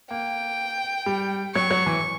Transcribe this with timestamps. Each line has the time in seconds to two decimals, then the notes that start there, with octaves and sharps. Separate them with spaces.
0.10 A#3 G5
1.06 G3
1.55 F#3 C#6
1.71 F#3
1.86 E3